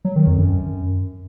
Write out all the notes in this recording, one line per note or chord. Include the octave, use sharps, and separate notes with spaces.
F#3
D#3
F2
F#2